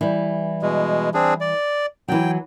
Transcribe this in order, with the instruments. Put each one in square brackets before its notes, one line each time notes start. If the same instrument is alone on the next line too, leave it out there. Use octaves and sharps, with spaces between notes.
[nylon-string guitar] E3 G3
[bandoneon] B2 G#3
C4 D4 G#4
D5
[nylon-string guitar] E3 F#3 [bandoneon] G5